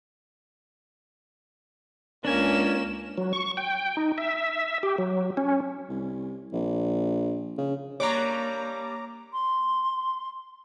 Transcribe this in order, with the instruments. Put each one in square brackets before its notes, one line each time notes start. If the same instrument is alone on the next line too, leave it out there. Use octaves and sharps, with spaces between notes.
[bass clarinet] C#2 [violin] A#3 E7 [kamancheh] C#4 [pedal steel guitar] D4 G#5
[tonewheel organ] F#3
C#6
G5
D#4
E5
G4
F#3
C#4
[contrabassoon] C2
A#1
C#3
[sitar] G3 D4 [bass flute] A#3 [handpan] C#5 [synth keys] A#5 D6
[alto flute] C6